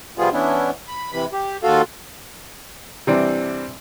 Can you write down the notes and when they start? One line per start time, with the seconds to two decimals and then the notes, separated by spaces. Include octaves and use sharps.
0.18 C3 F3 G3 B3 F4 G#4
0.33 E3 B3 C#4 D4 E4
0.88 B5
1.12 C3 E3 B5
1.33 G4
1.63 D#2 F4 F#4 A4 F5
3.07 C3 E3 G3 C4 D4